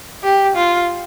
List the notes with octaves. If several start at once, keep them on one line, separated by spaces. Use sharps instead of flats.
G4
F4